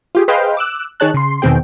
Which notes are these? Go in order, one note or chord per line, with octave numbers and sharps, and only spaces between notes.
F4 G4 G#4
G#4 B4 C5 D#5 F5 G5
D6 E6 F#6
D#3 G#4 C#5 A5 F#6
C#3 C6
E2 B2 D#3 C4 G#4 G5